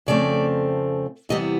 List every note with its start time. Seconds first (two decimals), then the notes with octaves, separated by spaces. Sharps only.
0.06 F2 C#3 F3 A3 C4 D5
1.29 E2 C3 E3 G3 B3 D#5